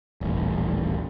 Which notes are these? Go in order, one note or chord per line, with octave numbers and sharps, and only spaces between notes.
D#1 A1